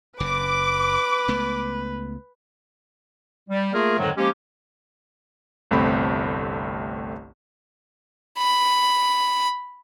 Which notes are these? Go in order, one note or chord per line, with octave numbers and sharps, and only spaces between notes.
F#1 C#3 B4 D6
C#2 A3 B3
G3
A3 A#3 F4 G#4 A#4
F2 G#2 D3 D#3 F#3 G#3
F3 G#3 A#3 C#4 G4
G1 C2 A3 C4 B5
B5